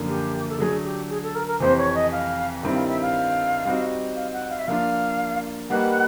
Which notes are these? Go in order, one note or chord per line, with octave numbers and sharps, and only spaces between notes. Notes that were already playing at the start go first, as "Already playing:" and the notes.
Already playing: F#2 D3 F3 A#3
G4
A4
D3 F#3 A3 G#4
G4
G#4
A4
A#4
A#4
F2 C3 E3 C5
C#5
D#5
F5
G2 D#3 G3 C4 E4
F5
E5
F5
G3 C4 D#4 F#4
F5
F#5
F5
E5
F3 A#3 D4 F4 F5
G3 A#3 D#4 G4 B4 F#5